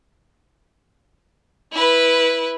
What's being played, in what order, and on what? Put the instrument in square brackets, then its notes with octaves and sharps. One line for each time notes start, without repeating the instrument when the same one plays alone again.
[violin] E4 B4